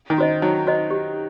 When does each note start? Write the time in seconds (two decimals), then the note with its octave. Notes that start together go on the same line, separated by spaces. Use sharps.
0.10 D#3
0.18 F#4 C5 D#5
0.42 F#3 D#4
0.67 F#4 C5 D#5
0.91 G4